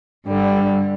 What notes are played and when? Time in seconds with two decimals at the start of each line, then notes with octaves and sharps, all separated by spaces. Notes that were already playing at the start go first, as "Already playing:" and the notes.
0.26 G2 D3 G3